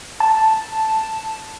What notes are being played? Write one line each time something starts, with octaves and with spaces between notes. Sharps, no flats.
A5